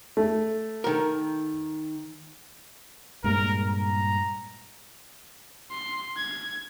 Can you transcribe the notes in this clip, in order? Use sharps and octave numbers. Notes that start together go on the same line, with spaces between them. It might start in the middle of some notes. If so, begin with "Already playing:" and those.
A3
D#3 A#4
G2 A#2 G#3 A#4
A#5
C6
G#6